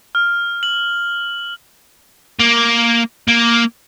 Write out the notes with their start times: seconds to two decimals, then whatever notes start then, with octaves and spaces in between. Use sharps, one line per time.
0.15 F6
0.63 F#7
2.39 A#3
3.28 A#3